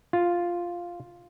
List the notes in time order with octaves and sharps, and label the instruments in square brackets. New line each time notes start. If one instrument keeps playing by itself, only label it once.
[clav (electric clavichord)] F4